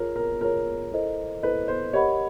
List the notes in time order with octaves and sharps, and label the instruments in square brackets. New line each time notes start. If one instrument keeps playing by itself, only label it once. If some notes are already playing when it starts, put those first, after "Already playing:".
Already playing: [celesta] F4 G#4 C#5 [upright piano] A#4
[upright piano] A#4
[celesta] F4 G#4 C#5 [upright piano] A#4
[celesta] E4 A4 C5 D#5
[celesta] E4 A4 C5 D#5 [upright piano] B4
[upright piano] C5
[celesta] G4 A#4 D#5 F#5 B5 [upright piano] C#5